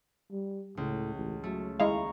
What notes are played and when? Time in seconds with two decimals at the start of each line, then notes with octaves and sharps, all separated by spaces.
0.31 G3
0.77 C#2 A2
1.15 A1
1.44 F#3 A3
1.80 D#2 G#3 E4 F5 A#5 C#6